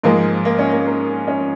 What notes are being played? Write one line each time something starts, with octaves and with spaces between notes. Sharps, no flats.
G#2 F3 G#3 A#3
A#3
C#4
A#3
A#3
C#4